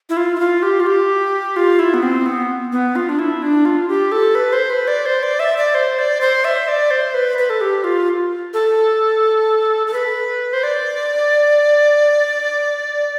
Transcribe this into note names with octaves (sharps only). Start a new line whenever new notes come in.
E4
F4
E4
F4
G4
F4
G4
F4
E4
B3
C4
B3
B3
F4
D4
E4
D4
F4
G4
A4
B4
C5
B4
D5
C5
D5
E5
D5
C5
D5
C5
E5
D5
C5
B4
B4
A4
G4
F4
A4
A4
B4
C5
D5